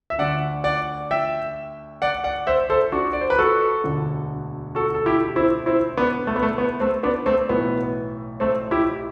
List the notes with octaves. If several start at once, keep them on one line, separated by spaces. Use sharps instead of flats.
E5
D2 D3 D5 F#5
D5 F#5
E5 G5
D5 F#5
D5 F#5
C5 E5
A4 C5
D4 F#4
D5
C5
B4
F#4 A4
E1 D2 D3
F#4 A4
A4
E4 G4
C4 E4
C4 E4
B3 D4
A3
B3
A3
B3
A3 C4
B3 D4
A3 C4
B1 A2 E3 B3
A3 C4
E4 G4